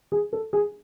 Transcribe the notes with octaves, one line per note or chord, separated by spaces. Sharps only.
G#4
A4
G#4